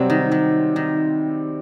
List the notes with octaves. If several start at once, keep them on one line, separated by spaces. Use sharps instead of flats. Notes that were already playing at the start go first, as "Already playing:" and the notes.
Already playing: C3 F#3 G3 C4
D#3
D#3
D#3